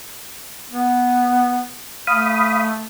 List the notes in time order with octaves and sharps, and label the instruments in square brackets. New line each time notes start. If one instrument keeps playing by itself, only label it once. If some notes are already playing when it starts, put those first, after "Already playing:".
[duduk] B3
[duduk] A3 [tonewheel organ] F5 B5 D#6